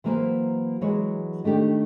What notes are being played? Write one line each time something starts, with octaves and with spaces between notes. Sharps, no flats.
E3 F#3 A#3 B4 C5
E3 F#3 G#3 C#5
D#3 A3 D4 G4